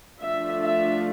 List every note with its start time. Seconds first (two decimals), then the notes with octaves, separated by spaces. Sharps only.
0.21 F3 A3 D4 F4 E5
0.63 E5